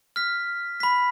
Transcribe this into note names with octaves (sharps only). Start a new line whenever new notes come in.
F6 B6
B5 B6